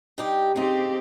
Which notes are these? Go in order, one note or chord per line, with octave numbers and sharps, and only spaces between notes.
G2 D#4 G4
C#3 C4 D#4 G4